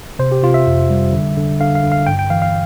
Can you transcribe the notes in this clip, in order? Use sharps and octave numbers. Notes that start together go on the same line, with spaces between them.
C3 C5
G4
C3 F4
E5
F2
G3
D3
D3
D3 F5
F5
D3
F5
G2 G5
G5
E3 F5
F5